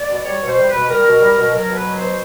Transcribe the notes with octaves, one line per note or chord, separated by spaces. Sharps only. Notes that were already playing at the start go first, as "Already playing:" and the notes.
Already playing: D5
B2
G3 C#5
B2
C5
G3
B4
B2
G3 A#4
B2
G3
B2
F#3 A#4
B2
B4
F#3
C5
B2